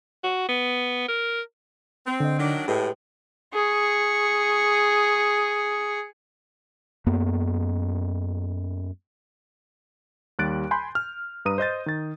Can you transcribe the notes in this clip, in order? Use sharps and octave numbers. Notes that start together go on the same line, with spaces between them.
F#4
B3
A#4
C4
D3 D#5
D#3 F#3 D4
A2 G#3 G4 B4 G5
G#4 C#6
F#2 A#3 B3
D#2 G3 F#6 A6 D7
G#5 B5 C6 G6
F6
G2 B4 A#5 D#6 D#7
C5 D#5 G6 A6
D#3 A6